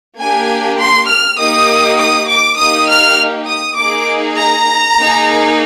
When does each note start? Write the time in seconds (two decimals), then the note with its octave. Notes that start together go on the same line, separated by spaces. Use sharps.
0.17 A#3 D4 G4 G#5
0.78 C6
1.08 F6
1.37 A#3 D#4 G4 D#6
1.98 D#6
2.27 D6
2.57 A#3 D#4 G4 D#6
2.88 F6
3.47 D#6
3.77 A#3 D#4 G#4 D6
4.37 A#5
4.97 A#3 D#4 G#4